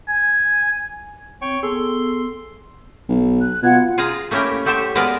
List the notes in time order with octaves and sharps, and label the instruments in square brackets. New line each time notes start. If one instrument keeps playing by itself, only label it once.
[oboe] G#5
[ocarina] C4 [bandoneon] C#5 G5 C#6
[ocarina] B3 [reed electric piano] G#4 A4 [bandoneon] C6 [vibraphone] E6
[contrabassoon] B1
[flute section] F#6
[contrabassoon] B2 [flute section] F4 F#5 G#6
[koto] F4 G#4 F5 G#5 A#5
A3 A#3 C#4 E4 G4 A#4
F#3 A3 G4 A4 C5 E5
G#3 B3 A#4 B4 D5 F5